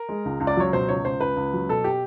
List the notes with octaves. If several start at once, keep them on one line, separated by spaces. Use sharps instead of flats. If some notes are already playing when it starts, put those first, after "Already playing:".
Already playing: A#4
G#3
C#2
C#2
D5
F#3 C#5
B2 C5
C#2 C#5
C#2 C5
C#2 B4
C#2
F#3
B2 A4
G4